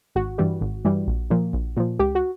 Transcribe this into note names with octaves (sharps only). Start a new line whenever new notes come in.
G#1 F#4
G2 E3 G3
G#1
G2 E3 G3
A#1
A#2 F3
A#1
A#2 F3
C#2 G4
F#4